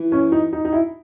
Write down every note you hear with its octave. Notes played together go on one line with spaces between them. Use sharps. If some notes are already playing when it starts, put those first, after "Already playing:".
Already playing: E3
C#4
D#4
D#4
D#4
E4